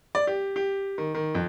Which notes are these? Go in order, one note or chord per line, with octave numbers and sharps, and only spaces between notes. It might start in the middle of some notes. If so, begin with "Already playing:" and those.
D5
G4
G4
D#3
D#3
F2